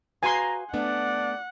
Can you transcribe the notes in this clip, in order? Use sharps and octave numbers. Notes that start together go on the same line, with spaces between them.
F#4 B4 F5 G#5 A#5 C6
A3 B3 D4 D5 F#5